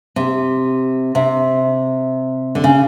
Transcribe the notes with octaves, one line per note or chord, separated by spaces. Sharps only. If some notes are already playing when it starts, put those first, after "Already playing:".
C3
C3
D3
C#3